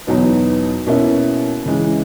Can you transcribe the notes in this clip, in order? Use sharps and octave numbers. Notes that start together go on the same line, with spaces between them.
E2 B2 F#3 B3 D#4
B2 A#3 C#4 E4
C#3 E3 G#3